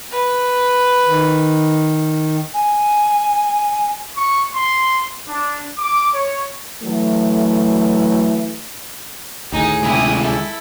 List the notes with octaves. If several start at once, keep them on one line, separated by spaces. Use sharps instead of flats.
B4
D#3
G#5
C#6
C6
D4
D6
C#5
E3 F#3 A3
D2 A2 D#3 D#4 G#4
C3 G#3 E4 D#6
E4 A4